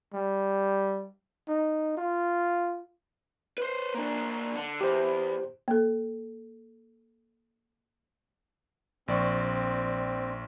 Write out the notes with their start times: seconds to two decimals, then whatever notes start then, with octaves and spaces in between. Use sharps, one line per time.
0.14 G3
1.48 D#4
1.98 F4
3.58 B4 C5
3.95 A#3 D4
4.57 D3
4.81 E2 G4 C5
5.68 A#3 A4
9.08 A#1 C4 D5 C#6